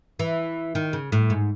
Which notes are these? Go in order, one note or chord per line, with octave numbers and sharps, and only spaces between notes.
E3
D#3
C#3
A2
G#2